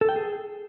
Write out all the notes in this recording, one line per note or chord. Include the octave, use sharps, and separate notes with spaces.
A4
G5
G#4